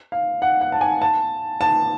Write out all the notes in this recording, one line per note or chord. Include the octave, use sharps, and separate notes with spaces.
F5
F#5
F#5
A5
G#5
A5
A5